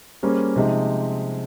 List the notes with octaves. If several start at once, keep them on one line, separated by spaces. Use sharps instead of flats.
G3 A#3 C#4 G#4 C5
C3 F3 G#3 D#4